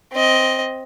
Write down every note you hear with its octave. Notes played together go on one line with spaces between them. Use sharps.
C4 D#5